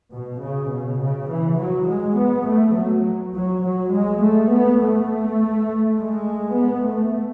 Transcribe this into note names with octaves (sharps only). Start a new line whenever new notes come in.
B2
C#3
B2
C#3
E3
F#3
G#3
B3
A3
F#3
F#3
F#3
G#3
A3
B3
A3
G#3
B3
A3